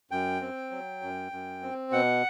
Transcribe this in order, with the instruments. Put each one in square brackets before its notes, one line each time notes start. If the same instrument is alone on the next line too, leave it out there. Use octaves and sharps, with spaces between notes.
[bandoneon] F#2 G5
C4
F#3
F#2
F#2
C4
B2 F#5